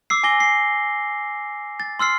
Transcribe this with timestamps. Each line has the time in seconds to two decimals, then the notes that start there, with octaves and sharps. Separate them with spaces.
0.10 D6 E6 C7
0.23 G#5 D6 A#6 G7
0.40 C7
1.80 A6
1.99 C6 E6 F6 C7